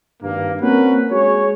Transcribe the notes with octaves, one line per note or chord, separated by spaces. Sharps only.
G#1 G2 A#3
A#3 C4 C#4 F#4 A#4 B4
G#3 F#4 G#4 C#5